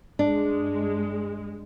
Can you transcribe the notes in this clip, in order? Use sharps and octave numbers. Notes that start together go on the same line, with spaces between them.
G2 G#3 D4